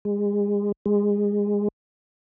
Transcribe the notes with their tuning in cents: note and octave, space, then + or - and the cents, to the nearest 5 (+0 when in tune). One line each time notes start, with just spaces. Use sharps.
G#3 -30
G#3 -20